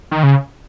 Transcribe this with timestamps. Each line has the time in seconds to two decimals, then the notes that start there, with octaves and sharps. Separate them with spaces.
0.11 D#3
0.23 C#3